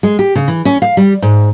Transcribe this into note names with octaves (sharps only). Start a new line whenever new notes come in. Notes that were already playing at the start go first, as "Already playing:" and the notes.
G#3
G4
C#3
E3
C#4
F5
G3
G#2